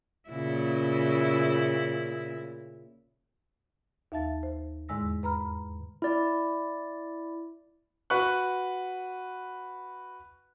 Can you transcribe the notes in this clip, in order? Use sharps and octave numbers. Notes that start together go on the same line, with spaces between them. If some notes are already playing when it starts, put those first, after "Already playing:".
A#2 C#3 E4
D#2 E5 F5 A5 A6
C5
E2 G#2 D3 G#3 E6 A#6
B4 A#5 B5 F6
E4 D5
F#4 B4 C#6 F#6